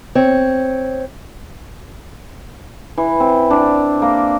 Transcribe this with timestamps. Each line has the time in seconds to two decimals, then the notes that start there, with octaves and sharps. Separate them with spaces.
0.15 C4 C#5
2.98 E3
3.20 C4
3.50 D4
4.02 A#3